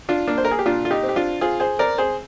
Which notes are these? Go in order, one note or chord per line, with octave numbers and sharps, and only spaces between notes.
D4 F4
A#3 D4
C5
A#4
G#4
G4
A#2 D4 F4
F4
D#4 G4
C4
G4
D4 F4
C4 F4 G#4
G#4 C5
C4 A#4 D5
G#4 C5